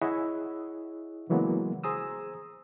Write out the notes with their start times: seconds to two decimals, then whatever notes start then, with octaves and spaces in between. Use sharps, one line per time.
0.02 E4 G#4 C#5 D#5 E5 F#5
1.30 C#3 E3 F#3 G#3 A#3 B3
1.84 G#4 C5 G#5 A#5 D#6 E6